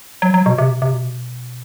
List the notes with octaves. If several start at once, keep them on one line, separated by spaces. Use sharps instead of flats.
F#3
F#3
B2
C3
B2
C3
B2